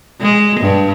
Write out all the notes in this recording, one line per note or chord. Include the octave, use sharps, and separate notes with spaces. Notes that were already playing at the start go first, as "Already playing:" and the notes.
G#3
G2